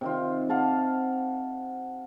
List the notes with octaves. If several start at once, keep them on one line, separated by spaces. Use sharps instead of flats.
C3 D#3 F4
F5 F#5 A5 D6